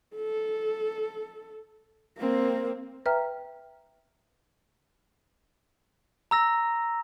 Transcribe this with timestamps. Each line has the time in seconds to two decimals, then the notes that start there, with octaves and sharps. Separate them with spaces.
0.16 A4
2.18 A#3 C4
3.06 B4 E5 G5 A#5 F6
6.31 A#5 E6 A#6